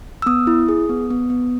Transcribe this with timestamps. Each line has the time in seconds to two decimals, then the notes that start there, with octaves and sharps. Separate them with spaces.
0.22 E6
0.26 B3 D#6
0.47 E4
0.69 G#4
0.89 B3
1.10 B3
1.30 B3